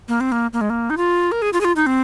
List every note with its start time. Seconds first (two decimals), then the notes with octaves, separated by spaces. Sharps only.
0.08 A#3
0.20 C4
0.32 A#3
0.53 A#3
0.61 G#3
0.70 A#3
0.90 D#4
0.97 F4
1.32 A#4
1.42 G#4
1.53 F4
1.61 G#4
1.65 F4
1.76 D#4
1.86 C4